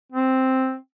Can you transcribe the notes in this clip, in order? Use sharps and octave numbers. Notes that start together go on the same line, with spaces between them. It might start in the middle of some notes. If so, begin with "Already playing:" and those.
C4